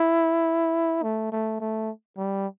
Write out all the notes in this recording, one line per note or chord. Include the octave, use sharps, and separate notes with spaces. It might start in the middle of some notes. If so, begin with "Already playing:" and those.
Already playing: E4
A3
A3
A3
G3